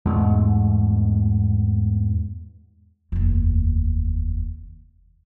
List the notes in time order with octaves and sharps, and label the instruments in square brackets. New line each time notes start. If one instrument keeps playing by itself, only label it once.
[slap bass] E2 G#2 B2 A3
[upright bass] F1 D#2